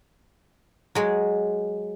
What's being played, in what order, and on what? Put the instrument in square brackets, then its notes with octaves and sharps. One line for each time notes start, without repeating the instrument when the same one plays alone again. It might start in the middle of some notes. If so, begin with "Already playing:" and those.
[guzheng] F#3 G#3 G#4